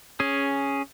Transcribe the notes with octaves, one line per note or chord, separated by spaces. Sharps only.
C#4 G#4